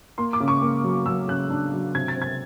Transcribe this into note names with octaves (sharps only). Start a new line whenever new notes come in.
A#3 C6
D6
C#3
C#6
A#3
F#3
F#3 E6
C#3 F#6
D4
F#3
C3 G#6
A6
C4
G#6